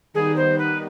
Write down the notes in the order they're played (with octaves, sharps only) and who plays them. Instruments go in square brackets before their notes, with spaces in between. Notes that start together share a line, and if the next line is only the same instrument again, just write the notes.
[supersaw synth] D#3 G3 B3 D#4 [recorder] G#4
[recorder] C5
B4